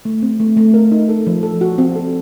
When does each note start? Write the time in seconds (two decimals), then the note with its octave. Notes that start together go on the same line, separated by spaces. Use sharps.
0.05 A3
0.22 C4
0.40 A3
0.57 A3
0.74 A#4
0.92 D#4
1.09 A4
1.27 F3
1.43 A4
1.61 F#4
1.78 C4
1.96 A4